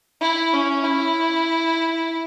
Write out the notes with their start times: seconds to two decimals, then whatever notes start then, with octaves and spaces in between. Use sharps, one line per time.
0.21 E4
0.53 C#4
0.84 E4